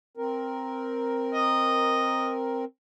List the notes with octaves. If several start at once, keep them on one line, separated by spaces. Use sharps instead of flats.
C4 A#4
D#5